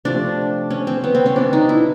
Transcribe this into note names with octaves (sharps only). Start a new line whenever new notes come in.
C3 F3 A3 D4
C#4
C4
B3
C4
C#4
B2 F#3 A#3 D4
D#4
E4